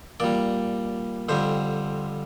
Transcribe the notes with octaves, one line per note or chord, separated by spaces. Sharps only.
A#2 G3 D5
F2 D3 G3 C5